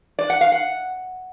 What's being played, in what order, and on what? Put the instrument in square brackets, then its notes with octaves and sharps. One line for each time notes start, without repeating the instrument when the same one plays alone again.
[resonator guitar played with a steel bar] D5
F#5
F5
F#5